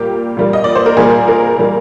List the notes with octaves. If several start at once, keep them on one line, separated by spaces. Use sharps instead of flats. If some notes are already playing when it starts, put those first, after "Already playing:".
Already playing: A#2 G3 A#3 G4
A#2 G3 A#3
D#5
D5
C5
A#4
A#2 G3 A#3 G#4
A#4
A#2 G3 A#3